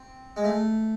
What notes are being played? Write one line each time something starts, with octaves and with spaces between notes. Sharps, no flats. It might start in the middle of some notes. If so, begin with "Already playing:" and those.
Already playing: C4
G#3
A3